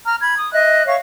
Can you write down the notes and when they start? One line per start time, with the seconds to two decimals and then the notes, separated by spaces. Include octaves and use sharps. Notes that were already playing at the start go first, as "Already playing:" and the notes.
0.05 A#5 F6
0.21 B5 G#6
0.37 D#6
0.52 D#5 E5 F#6
0.86 C#5 E5 F5 C#6